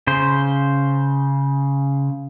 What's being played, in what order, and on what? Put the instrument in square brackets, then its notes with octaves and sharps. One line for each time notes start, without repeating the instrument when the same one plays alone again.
[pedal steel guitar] C#3 C5